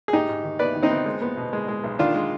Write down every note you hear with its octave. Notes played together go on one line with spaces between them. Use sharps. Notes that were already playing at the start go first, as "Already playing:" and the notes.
G#4
G#2 D#4 G4
G#2
D#3
B3 B4 D5
D#3
C4 D#4
B3
G#3
B3
B2
G#3
G#3
B1
D#3 D4 F4
G#3